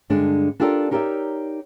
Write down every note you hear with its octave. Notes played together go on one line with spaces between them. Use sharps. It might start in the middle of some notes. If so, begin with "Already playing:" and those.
G2 D3 G#3 D4
D4 F4 G4 A4 A#4 D5
D#4 G4 A#4 C#5 D5 E5